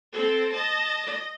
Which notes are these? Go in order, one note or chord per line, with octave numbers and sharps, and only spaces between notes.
C4 A4
D#5 A5
D#5